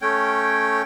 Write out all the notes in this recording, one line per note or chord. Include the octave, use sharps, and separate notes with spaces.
A3 C#4 C#5 G5